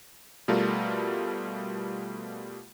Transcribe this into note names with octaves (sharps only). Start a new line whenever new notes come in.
B2 G3 A3 F4 A#4